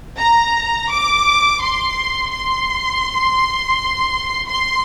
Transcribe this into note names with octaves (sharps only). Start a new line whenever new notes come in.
A#5
D6
C6
C6
C6